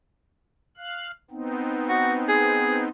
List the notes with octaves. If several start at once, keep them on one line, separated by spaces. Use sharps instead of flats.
F5 F#6
B3 C4 D#4
F#4
G#4